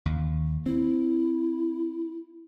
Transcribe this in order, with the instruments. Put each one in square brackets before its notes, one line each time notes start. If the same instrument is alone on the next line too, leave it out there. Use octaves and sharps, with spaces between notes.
[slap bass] D#2
[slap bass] C4 [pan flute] E4